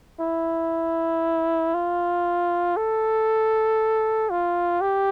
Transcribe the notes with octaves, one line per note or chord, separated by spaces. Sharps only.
E4
F4
A4
F4
G4